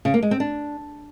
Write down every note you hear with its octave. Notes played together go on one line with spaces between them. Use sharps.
C#3
A#3
G#3
C4
D4